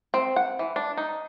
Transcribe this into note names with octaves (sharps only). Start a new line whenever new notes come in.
C4
F#5
E3
D4
D#4